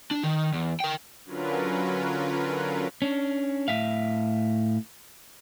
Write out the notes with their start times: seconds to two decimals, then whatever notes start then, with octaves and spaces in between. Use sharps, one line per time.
0.11 D4
0.24 D#3
0.53 E2
0.80 A#4 G5
1.25 D3 F#3 C#4 F4 A#4 B4
3.02 C#4 D4
3.68 A2 E5 F5